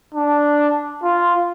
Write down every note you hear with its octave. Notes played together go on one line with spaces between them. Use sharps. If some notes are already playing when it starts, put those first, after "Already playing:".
D4
F4